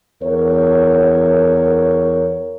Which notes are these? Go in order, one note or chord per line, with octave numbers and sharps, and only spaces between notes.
E2 A#4 C#5